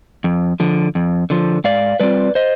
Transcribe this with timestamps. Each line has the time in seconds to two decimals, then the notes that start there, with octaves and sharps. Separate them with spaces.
0.24 F2
0.60 D3 F3
0.95 F2
1.30 D3 F3
1.64 G#2 D5 F5
2.00 G3 C4 F4 B4 D5
2.35 C5 D#5